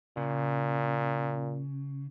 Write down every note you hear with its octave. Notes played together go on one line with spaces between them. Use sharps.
A#2 C#3